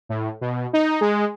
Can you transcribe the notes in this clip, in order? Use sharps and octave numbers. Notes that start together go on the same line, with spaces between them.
A2
B2
D#4
G#3